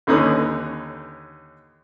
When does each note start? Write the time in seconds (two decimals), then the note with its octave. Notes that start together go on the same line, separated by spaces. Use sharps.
0.07 D#2 D3 C#4 D#4 B4 D#6